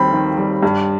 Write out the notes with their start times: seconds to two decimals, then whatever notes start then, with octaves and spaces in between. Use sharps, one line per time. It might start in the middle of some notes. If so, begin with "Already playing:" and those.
Already playing: D#2 D#3 G3 C4 B5
0.13 D#3
0.38 G3
0.63 G2